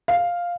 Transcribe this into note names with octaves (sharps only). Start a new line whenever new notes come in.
F5